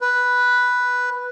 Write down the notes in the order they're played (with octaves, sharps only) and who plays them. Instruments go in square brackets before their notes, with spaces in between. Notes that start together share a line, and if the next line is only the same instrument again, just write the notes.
[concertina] B4